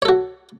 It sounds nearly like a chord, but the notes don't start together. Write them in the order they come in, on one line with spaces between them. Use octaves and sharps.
C#5 A4 F#4